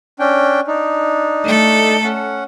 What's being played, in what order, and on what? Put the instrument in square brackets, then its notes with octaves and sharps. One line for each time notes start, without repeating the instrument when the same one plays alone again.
[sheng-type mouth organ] C#4 D4 G5
D4 D#4
[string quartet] A3 A4
[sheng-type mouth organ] C#4 F#5